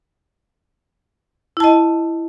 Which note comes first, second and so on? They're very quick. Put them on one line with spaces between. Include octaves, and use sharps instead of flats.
E4 A5 D#5